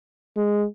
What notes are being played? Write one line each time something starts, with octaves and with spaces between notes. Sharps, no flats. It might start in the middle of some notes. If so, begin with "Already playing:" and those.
G#3